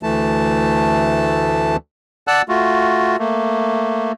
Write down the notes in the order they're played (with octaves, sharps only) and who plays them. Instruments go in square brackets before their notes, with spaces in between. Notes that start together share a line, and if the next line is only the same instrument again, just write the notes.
[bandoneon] D2 E3 A3 A5
D5 F#5 A5 E6 F#6
A3 F4 F#4
A3 A#3